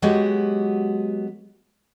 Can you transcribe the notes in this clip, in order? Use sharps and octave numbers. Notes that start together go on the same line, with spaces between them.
F#3 G#3 B3 F#4 G4